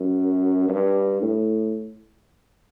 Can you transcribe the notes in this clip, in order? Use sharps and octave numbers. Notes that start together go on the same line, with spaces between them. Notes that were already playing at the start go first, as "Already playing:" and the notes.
Already playing: F#2
G2
A2